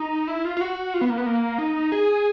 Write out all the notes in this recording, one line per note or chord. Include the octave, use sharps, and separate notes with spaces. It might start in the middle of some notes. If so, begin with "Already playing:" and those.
Already playing: D#4
E4
F4
F4
F#4
F4
B3
A#3
B3
A#3
D#4
G#4